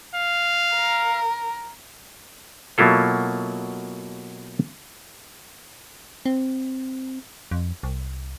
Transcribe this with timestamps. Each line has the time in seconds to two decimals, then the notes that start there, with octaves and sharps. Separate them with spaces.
0.15 F5
0.75 A#4
2.78 B2 F#3 A#3 E4 F4 A4
6.26 C4
7.51 F2
7.83 C2